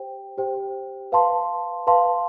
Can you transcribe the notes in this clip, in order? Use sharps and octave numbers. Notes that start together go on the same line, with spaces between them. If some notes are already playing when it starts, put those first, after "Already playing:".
Already playing: G4 C5 G5
G4 C5 G5
B4 F5 A5 C6
B4 F5 A5 C6